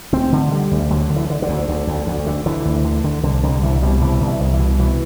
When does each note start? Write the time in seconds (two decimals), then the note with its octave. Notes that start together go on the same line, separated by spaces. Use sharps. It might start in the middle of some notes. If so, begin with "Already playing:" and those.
0.13 D2 C4
0.32 D3
0.51 D3 G3
0.71 D2
0.91 D3 F#3
1.10 D3
1.16 E3
1.30 D3
1.42 D3
1.48 D2
1.68 D2
1.87 D2
2.07 D2
2.27 D3
2.46 D3 E3
2.65 D2
2.85 D3
3.04 D3
3.23 C2 D3
3.43 C2 D3
3.62 C2 E3
3.82 B2 G3
4.01 C2 E3
4.21 C2
4.27 E3
4.40 C2
4.53 E3
4.59 B2
4.79 B2 E3